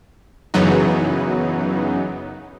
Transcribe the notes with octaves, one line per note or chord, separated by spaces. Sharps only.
F#2 C#3 E3 F#3 B3 D#4